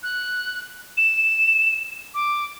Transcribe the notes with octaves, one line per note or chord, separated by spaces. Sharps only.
F#6
E7
D6